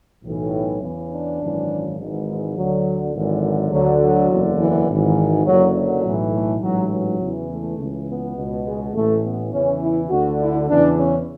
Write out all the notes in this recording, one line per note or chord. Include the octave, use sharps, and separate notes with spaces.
B1 A2 E3
E2 C#3 E3
D4
G#1 F#2 C#3 E3
G#1 G#2 E3
G#3
D2 D3 F#3
G#1 F#2 D3 E3
D2 D3 F#3
F#3
F#1 E2 D3
E3
G#1 G#2 E3
F#1 F#2 D3 F#3
F#3
B1 A2 E3
A3
A1 G#2 E3 F#3
F#3
E2 C#3 E3
A3
C#2 C#3 E3
B3
C#2 B2
G#3
A1 A2 E3 A3
B3
E2 C#3 E3 C#4
E4
D2 D3 F#4
E4
E2 C#3 E3 D4
C#4